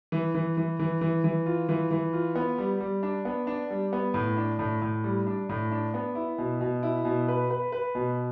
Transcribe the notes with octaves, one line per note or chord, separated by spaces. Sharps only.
E3
E3
E3
E3
E3
E3
F4
E3
E3
F4
B3
G3
G3
D4
B3
D4
G3
B3
A2
D4
A2
A2
G3
D4
A2
D4
B3
E4
B2
B2
E4
B2
B4
B4
B4
B2